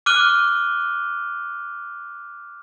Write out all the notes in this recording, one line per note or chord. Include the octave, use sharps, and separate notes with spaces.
D6 F6 F#6 D#7 G7